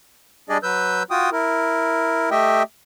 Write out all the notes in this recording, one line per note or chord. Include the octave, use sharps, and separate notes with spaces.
G3 D4 G#4 D5 D#5
F#3 B4 E6 G6
F4 F#4 G5 D#6
E4 A#4
A3 G4 D#5 E5 G5